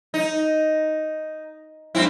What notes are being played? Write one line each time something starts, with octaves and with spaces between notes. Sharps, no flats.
D#4
G2 C4 E4